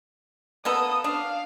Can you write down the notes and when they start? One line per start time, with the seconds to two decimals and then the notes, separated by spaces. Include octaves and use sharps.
0.65 A#3 B3 A4 D#6
1.04 D4 F5